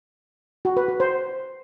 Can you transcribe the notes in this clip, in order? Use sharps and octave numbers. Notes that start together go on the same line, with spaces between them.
F#4
B4
F#4
C5